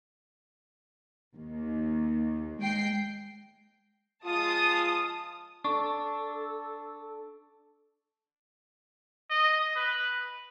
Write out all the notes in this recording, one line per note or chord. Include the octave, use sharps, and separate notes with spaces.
D#2
G#3 G5 C7
F3 G#3 F4 A5 D#6
D4 A4 C#6
D#5
B4